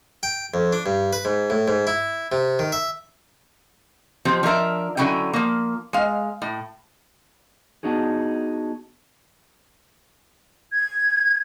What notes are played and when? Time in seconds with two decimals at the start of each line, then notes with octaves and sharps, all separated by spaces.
0.23 G5
0.54 F2
0.73 D4
0.86 G2
1.13 B4
1.25 G#2
1.50 A2
1.68 G#2
1.87 E4
2.32 C3
2.59 D#3
2.72 E5
4.25 F3 C4 G4
4.43 F3 D4 A#4 E5
4.97 D3 F#3 C#4 E4 G5
5.33 F3 A#3
5.93 G#3 F5
6.42 A2
7.83 B3 D4 D#4 F#4 G#4
10.73 G#6